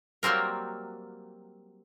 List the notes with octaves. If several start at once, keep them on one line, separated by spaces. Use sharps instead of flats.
F#3 G3 A#3 C4 A#4